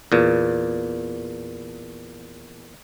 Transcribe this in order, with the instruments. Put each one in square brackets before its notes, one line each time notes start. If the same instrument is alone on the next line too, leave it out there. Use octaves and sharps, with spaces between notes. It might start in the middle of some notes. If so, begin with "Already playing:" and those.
[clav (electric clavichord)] E2 A#2